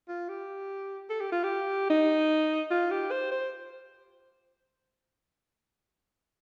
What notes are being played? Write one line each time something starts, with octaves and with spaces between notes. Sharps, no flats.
F4
G4
A4
G4
F4
G4
D#4
F4
G4
C5
C5